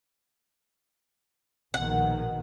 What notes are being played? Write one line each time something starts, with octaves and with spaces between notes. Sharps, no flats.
A#1 B2 D#3 F#5